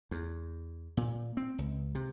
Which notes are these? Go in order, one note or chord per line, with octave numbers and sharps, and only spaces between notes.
E2
A#2
C4
C#2
C3